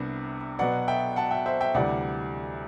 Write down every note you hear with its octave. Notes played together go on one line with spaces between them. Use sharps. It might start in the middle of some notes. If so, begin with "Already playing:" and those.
Already playing: C2 C3 G3 B3 D4
B2 F#3 B3 D5 F#5
E5 G5
F#5 A5
E5 G5
C5 E5
E5 G5
D2 C3 E3 G3 D5 F#5